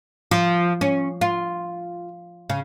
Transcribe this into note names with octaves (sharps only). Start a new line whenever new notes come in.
F3
C#4
F4
C#3